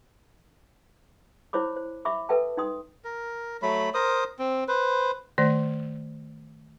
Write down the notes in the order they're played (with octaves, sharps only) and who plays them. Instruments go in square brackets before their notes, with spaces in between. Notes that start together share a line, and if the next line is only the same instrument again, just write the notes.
[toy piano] E4 C5 C#5 B5 D6
C5
E5 B5 C#6 D6
A4 B4 E5 G5 A5
D#4 G5 C6 D#6
[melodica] A#4
F#3 A3 B5
A#4 C5 D#6
C4
B4 C5
[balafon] D#3 A3 D5